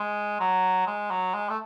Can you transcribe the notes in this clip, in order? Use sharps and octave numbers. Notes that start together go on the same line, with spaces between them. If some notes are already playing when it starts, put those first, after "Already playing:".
Already playing: G#3
F#3
G#3
F#3
G#3
A3